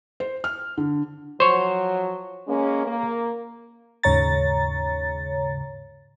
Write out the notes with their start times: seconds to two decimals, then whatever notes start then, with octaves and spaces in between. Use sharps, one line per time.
0.20 C5
0.44 F6
0.77 D3
1.40 F3 F#3 C5 C#5
2.47 G#3 A#3 C#4
2.86 A#3
4.03 D#2 G#2 C#3 C#5 A#5 A6